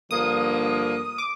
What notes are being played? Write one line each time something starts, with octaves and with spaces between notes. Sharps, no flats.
G2 D3 F3 A#3 D#6
D6